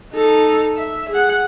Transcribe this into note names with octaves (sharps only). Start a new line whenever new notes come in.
D#4 A4
E5
G#4 F#5